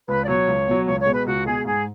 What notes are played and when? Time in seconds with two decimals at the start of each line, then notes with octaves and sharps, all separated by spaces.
0.08 C#2 B4
0.24 D5
0.28 B2 F#3 C#5
0.47 C#2
0.67 B2 F#3
0.86 C#2 C#5
0.99 C#5
1.06 B2 G#3
1.13 B4
1.25 C#2 F#4
1.45 B2 G#3 G#4
1.65 G#2 G#4